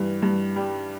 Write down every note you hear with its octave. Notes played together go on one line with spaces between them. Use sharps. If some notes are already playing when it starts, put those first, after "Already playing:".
Already playing: G2 E3
G2
G3